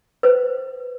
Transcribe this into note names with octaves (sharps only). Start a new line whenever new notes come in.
B4 C5